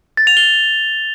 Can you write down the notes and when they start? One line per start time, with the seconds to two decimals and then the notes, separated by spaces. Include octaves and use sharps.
0.17 A6
0.27 F7
0.37 G7